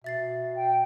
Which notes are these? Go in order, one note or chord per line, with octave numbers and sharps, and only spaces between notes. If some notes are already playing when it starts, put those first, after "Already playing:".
B2 E5 A6 C7
G5